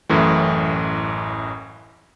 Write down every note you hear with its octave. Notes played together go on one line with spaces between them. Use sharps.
A1 F#2 A2 E3